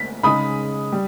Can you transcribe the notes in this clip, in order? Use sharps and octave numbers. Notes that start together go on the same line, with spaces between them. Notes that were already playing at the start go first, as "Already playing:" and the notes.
Already playing: B6
C#3 G#3 D#4 B5 D#6
G3